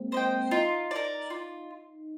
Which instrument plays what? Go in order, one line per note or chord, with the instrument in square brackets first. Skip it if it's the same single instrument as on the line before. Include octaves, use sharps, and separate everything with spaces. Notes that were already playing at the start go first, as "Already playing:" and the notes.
Already playing: [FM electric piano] G#3 A#3 C4
[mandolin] C5 D#5 G5
[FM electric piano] D#4 [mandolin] F4
[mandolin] A#4 D5
F4